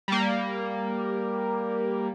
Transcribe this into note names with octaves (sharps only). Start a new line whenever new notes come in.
G3 A#3